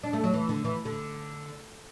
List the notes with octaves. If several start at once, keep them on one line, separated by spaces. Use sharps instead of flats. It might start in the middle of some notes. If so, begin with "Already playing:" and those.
D4
A3
F#3
E3
D3
E3
D3